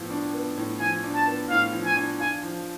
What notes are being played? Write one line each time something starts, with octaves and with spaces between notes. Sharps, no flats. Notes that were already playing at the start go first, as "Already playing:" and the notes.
Already playing: A2 F3 B3
D4
B3
A2
F3 G#5
D4
A5
B3
A2 F5
F3
G#5
D4
F4 G#5
F3